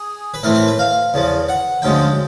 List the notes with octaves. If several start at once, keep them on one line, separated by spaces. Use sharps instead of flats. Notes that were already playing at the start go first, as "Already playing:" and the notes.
Already playing: G#4
B4
A2 E3 A3 C4 A#4
A#4
B4
F5
E2 C#3 F3
F#5
D2 C#3 F3 G#3 G5